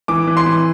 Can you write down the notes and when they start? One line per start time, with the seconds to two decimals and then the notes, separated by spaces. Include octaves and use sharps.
0.08 E3 D6
0.27 E3
0.37 C6
0.46 E3